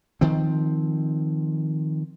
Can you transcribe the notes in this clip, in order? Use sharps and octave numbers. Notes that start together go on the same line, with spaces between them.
D#3 F3 C4